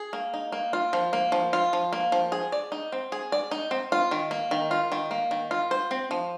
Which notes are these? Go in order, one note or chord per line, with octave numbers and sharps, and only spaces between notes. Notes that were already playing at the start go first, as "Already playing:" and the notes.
Already playing: G#4
A#3
D#4
A#3
F4
F3
A#3
F3
F4
F3
A#3
F3
G#4
D5
D#4
C4
G#4
D5
D#4
C4
F4
D#3
A#3
D#3
F4
D#3
A#3
D#3
F4
C5
C4
F3